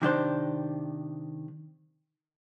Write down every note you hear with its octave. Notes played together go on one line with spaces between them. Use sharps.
C3 D#3 D4 C5